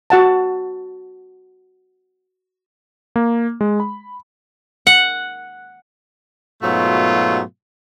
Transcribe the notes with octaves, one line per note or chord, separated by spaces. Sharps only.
F#4 F#5 A5
A#3
G#3
B5
F#5
G#2 B2 F#3 A3 B3 F4